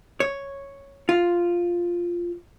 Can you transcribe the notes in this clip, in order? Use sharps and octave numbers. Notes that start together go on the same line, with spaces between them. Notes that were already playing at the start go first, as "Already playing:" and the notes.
C#5
F4